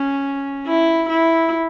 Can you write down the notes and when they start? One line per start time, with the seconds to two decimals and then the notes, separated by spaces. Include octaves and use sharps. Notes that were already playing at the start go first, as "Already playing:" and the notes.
Already playing: C#4
0.67 E4
1.09 E4